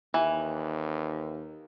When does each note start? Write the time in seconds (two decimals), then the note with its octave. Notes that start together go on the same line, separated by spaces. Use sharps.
0.14 D#2 E3